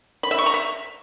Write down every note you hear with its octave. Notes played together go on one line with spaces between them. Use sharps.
B5
E5
C#6
A#5
E5